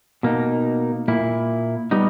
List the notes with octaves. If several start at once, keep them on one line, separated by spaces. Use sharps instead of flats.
B2 A#3 D#4
A#2 A#3 E4
G3 B3 D#4